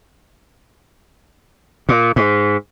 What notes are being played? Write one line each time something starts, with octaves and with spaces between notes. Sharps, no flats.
A#2
G#2